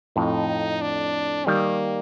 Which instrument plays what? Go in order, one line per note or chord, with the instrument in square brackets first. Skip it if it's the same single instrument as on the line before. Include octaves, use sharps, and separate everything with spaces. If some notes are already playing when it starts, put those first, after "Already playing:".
[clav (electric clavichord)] F2 A2 [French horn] D#4
[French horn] D4
[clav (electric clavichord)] D#3 G3 [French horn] A#3